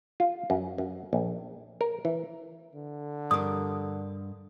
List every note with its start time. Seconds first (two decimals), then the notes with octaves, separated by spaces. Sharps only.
0.20 F4
0.50 F#2
0.78 F#2
1.13 A#1
1.81 A#4
2.05 E3
2.75 D3
3.31 G2 A#4 D#6